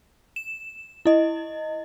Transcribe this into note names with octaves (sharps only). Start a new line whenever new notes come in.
E7
E4 D#5